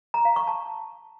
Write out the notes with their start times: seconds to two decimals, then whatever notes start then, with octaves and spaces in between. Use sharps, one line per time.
0.14 A#5
0.25 F5
0.36 C#6
0.47 A5